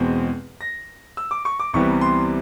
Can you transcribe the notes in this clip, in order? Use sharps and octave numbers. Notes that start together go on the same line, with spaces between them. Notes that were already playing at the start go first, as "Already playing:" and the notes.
Already playing: E2 B2 G#3 C4
A#6
E6
D6
C#6
D6
C2 C3 E3 G3 B3 C#6
C6